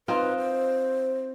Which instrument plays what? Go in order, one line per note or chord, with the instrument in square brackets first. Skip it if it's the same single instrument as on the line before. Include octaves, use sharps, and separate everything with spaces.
[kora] C4 D#4 F4 [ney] B4
[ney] C5